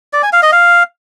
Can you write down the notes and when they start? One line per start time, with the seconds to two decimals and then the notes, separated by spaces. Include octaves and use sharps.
0.13 D5
0.23 G#5
0.33 F5
0.42 D#5
0.52 F5